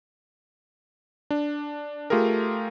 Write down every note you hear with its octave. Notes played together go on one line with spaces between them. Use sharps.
D4
A3 F4 G4 G#4 A#4